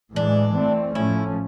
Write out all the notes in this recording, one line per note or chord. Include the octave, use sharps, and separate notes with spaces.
A2 E3 G#3 D4
E3 A3 C4
A2 F3 A3 C#4 E4